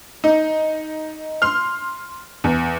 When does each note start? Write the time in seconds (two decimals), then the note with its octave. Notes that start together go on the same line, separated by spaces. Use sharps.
0.24 D#4
1.42 C6 F6
2.44 E2